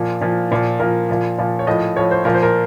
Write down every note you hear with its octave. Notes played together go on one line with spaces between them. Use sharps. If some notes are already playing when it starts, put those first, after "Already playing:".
Already playing: A#2 F3
A#2 F3
A#2 F3
A#2 F3 A#4
A#2 F3
A#2 F3
C#5
A2 F3 D#5
A2 F3 C#5
C5
A#2 F3 A#4
C5
A#4